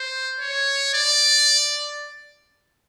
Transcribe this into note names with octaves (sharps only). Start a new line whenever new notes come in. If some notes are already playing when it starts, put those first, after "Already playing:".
Already playing: C5
C#5
D5